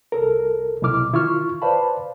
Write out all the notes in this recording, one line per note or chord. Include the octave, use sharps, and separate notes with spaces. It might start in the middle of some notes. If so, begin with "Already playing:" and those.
C2 A4 A#4
C2 B2 F#3 E4 D6 F6
D#3 E4 F4 C#6 F6
B4 C5 D5 F5 A5 B5